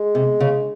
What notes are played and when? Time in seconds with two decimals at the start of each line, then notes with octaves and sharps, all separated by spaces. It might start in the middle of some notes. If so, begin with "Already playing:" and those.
Already playing: G#3
0.15 C3
0.40 C#3